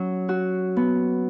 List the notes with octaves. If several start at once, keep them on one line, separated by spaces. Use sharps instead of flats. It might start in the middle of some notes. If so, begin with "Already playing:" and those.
Already playing: F#3 C#4
F#4
B3